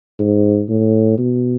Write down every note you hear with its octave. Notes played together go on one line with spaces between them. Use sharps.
G#2
A2
B2